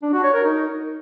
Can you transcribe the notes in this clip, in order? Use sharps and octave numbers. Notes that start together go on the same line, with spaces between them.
D4
F#4
C#5
A#4
D#4